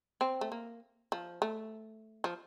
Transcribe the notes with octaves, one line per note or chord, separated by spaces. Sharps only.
C4
A3
A#3
F3
A3
F3